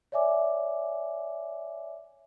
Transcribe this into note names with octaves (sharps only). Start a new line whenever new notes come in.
C#5 D5 E5 G#5 D6